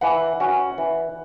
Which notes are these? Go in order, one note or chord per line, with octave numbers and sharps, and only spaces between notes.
E3 F#5
C#4 F#4
E3